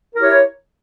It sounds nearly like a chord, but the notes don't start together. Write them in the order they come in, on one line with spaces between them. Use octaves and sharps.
A#4 E4 G4 C#5